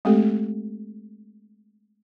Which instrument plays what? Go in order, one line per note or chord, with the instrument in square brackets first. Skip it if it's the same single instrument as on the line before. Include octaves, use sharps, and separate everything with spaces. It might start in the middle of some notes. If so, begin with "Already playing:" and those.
[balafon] G#3 A3 C4 G4 A4